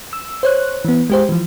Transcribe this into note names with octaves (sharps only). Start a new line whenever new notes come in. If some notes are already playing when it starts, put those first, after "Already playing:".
E6
C5 C#5 F#6
E3 B3
G#3 G4 C5
E3 F3